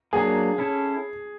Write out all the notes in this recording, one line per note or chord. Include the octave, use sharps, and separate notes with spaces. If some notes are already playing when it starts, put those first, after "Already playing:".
F#3 A#3 D4 G#4
C#4 E4 A4